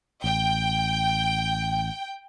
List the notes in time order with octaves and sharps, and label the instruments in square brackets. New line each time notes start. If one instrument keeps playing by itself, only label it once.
[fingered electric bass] A1 [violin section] G5